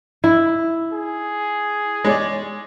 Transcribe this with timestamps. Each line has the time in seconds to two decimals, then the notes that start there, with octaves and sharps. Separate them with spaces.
0.24 E4
0.92 G#4
2.04 G#3 C#5 D5